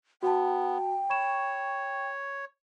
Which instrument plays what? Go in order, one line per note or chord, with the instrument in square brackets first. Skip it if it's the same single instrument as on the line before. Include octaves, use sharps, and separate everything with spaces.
[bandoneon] B3 [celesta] F#4 A5 [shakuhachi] G5
[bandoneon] C#5 [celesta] B5 C#6 E7